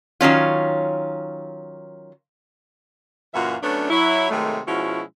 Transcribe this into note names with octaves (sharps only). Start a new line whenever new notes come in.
D#3 F#3 C#4 F4
F#2 A#2 E3 F4 F#4 E5
F#3 A3 B3 C#4 D4
F#3 E4
C3 D#3 F#3 G#3 A3
B2 F3 G#3 C#4 E4 F#4